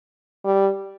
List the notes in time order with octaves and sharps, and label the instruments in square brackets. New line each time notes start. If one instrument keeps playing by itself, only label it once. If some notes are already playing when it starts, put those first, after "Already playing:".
[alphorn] G3